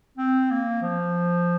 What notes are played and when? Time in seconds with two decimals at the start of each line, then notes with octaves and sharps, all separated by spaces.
0.18 C4
0.51 A#3
0.82 F3